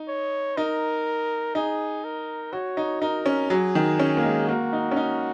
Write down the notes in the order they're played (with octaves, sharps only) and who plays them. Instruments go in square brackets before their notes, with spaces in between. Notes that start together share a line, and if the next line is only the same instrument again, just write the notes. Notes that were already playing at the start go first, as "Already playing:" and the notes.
Already playing: [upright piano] D#4
[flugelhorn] C#5
[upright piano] D#4 [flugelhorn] A#4
[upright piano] D#4 [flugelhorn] G#4
[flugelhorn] A#4
[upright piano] F#4 [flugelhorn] C#5
[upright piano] D#4
[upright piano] D#4 [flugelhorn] A#4
[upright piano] C#4
[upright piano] F#3 [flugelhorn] G#4
[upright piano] D#3
C#4
A#3
G#3
[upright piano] A#3 [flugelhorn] F#4
[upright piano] D#4
C#4
D#4